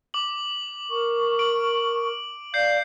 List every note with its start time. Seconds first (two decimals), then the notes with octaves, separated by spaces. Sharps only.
0.14 D6 F#7
0.90 A#4 C#6
1.39 D7 F#7
2.54 D5 F5 G6 C7